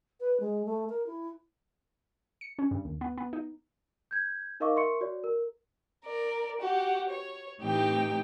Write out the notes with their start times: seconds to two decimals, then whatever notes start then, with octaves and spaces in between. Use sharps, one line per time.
0.20 B4
0.40 G#3
0.66 A3
0.89 A#4
1.06 E4
2.41 C#7
2.59 C#4
2.71 G2
2.85 D#2
3.01 B3
3.18 B3
3.33 D#4
4.11 G6 G#6
4.60 D#4 A#4 D#5 F5 C#6 D6
4.76 A#4 E5 C6 C#6 C#7
5.01 F#4 C#5 D5
5.24 A#4
6.05 A#4 D5
6.60 F#4 G4 F#5
7.09 C#5
7.61 A2 E3 C4 D#4 G4 G5